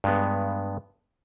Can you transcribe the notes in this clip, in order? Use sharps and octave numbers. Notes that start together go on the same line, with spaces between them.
G2 G#3 B3